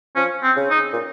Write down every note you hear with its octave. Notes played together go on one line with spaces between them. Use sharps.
F3 C#4
C4
C#3
D#4
A#2